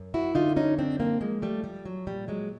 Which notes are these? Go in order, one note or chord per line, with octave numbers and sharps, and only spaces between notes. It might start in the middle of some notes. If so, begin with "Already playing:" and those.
Already playing: F#2
E4 F#4
D3 D#4 F4
C#4 D#4
F#2 C4 D4
A#3 C4
F3 G#3 A#3
G3 A3
F3 G3
F#3
A#2 G3
F#3 G#3